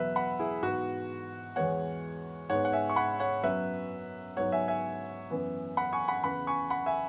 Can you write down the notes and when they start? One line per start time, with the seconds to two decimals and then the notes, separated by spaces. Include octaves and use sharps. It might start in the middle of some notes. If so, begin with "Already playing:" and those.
Already playing: E2 B2 F#3 B3 B4 E5
0.16 F#5 B5
0.39 E4 G#4
0.63 G#2 E3 B3 F#4
1.56 E2 E3 G#3 B3 C#5 F#5
2.49 G#2 G#3 B3 C#5 F#5
2.65 F#5
2.73 E5 G#5
2.90 C#6
2.96 F#5 B5
3.20 C#5 F#5
3.43 F#2 F#3 B3 B4 E5
4.37 G#2 F#3 B3 C#5 F#5
4.52 E5 G#5
4.68 E5 G#5
5.30 F#2 E3 B3
5.77 F#5 B5
5.92 G#5 C#6
6.08 F#5 B5
6.24 E2 C#3 E3 F#5 B5
6.47 G#5 C#6
6.70 F#5 B5
6.86 E5 G#5